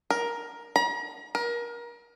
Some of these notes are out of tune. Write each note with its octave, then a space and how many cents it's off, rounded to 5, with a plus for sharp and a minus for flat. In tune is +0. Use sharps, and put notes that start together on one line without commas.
A#4 +10
A#5 +40
A#4 +30